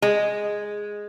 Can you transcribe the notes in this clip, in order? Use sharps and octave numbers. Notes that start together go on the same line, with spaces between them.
G#3